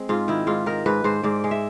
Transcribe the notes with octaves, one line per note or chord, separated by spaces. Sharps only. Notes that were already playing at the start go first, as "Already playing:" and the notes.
Already playing: G#3 C4
G#2 F4
D#3 E4
G#2 F4
D#3 A#4
G#2 B4
G#2 C5
G#2 D5
G#3
E5